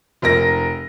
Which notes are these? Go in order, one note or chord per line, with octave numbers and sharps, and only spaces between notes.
F1 A#4 A#6